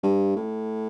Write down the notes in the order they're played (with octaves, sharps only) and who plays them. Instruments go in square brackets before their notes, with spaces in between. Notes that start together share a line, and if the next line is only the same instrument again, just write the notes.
[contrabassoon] G2
A2